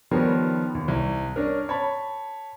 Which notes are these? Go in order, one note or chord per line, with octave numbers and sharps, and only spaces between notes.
D#3 F3 G3 B3 A#4 C#5
D#2
C2
C#4 D4 A#4
C#5 A5 B5